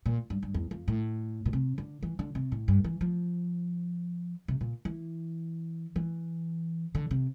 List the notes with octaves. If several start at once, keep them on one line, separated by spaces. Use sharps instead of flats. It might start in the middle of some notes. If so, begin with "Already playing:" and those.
A#2
G2
G2
E2
F2
A2
A#2
C3
D3
E3
D3
C3
A2
G2
E3
F3
C3
A#2
E3
E3
D3
C3